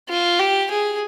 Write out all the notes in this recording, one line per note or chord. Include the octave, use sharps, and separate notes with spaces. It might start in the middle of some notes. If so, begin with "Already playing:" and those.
F4
G4
G#4